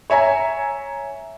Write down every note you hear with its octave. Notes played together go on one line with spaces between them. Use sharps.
C#5 E5 G#5 A#5